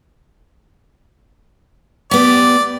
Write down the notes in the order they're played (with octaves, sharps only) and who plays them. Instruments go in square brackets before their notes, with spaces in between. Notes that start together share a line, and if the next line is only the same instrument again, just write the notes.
[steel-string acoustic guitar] B3 G4 [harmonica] D5